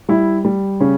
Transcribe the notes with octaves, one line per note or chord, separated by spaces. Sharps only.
G3 E4
G3
C#3 C#4